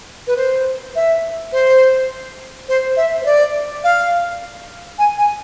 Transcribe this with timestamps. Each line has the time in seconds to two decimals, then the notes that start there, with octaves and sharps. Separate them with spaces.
0.27 B4
0.36 C5
0.95 E5
1.52 C5
2.68 C5
2.96 E5
3.21 C5
3.25 D5
3.84 F5
4.98 G#5
5.17 G#5